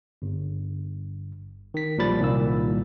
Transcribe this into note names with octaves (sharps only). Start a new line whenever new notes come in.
G1
D#3 B6
B1 A#2 F3 G3 B5 A6
C2 A#2 D#3 A#3 E6